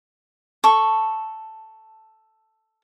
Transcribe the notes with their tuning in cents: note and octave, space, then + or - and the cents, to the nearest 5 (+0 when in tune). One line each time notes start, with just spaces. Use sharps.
A4 +0 C#6 -5